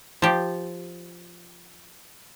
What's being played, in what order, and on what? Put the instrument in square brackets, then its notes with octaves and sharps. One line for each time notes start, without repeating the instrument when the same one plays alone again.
[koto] F3 G4